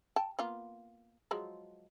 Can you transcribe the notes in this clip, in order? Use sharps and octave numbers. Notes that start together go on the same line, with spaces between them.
G5 A5
A#3 B3 F4
F3 F#3 G#3